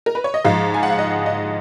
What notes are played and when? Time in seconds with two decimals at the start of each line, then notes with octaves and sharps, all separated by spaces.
0.06 A#4
0.15 B4
0.24 C#5
0.34 D#5
0.44 G#2 F3 F5
0.74 G#5
0.83 F#5
0.90 F5
0.99 D#5
1.26 D#5